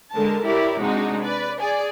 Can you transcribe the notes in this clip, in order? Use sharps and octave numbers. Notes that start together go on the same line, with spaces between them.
D3 G#3 A#4 A5
E4 G4 A#4 C#5 D5
C3 G#3 D4 D#4 F#4
B4 D5
G#4 D5 G#5